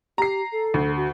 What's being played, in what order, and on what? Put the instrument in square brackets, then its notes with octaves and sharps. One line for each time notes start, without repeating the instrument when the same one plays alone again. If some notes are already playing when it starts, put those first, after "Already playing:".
[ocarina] G4 [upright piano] A#5 C7
[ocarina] A4
[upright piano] D2
[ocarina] F#4